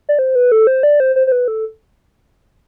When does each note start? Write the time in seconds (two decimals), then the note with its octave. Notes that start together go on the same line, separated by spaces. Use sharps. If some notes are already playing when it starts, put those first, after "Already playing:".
0.09 D5
0.19 C5
0.35 B4
0.52 A4
0.67 C5
0.83 D5
1.00 C5
1.16 C5
1.27 C5
1.32 B4
1.48 A4